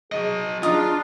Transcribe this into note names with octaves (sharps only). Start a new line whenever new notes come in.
F#3 G#4 D#5
D4 D#4 F4 D#6